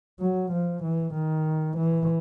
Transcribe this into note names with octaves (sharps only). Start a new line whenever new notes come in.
F#3
F3
E3
D#3
E3